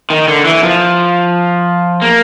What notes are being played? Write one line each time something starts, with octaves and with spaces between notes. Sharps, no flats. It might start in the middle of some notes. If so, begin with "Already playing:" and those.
D#3
D3
E3
F3
A#3